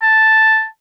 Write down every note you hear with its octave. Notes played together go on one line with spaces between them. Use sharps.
A5